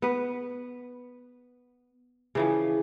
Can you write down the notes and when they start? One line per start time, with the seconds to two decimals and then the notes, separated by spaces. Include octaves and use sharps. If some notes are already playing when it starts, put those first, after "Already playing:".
0.02 B3 B4
2.35 C#3 E3 F3